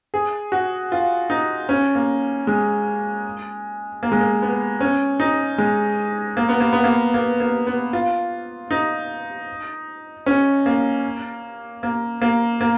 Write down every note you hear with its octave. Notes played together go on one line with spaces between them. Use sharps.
G#4
F#4
F4
D#4
C#4
A#3
G#3
A#3
G#3
A#3
B3
C#4
D#4
G#3
A#3
B3
A#3
B3
A#3
A#3
A#3
B3
F4
D#4
C#4
A#3
A#3
A#3
A#3